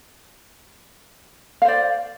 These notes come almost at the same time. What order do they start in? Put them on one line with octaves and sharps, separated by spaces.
F5 C5 D5